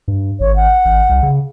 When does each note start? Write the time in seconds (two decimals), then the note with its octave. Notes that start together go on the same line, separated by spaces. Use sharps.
0.08 G2
0.40 G#1 C#5
0.56 F#5
0.85 G#1
1.09 C2
1.23 C#3